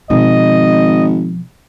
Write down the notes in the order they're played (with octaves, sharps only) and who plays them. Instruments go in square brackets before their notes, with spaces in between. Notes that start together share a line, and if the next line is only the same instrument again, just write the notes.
[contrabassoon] G#1 [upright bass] B2 F3 [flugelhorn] D#5